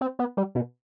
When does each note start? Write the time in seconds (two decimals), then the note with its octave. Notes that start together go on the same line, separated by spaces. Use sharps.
0.01 C4
0.19 B3
0.37 G3
0.55 B2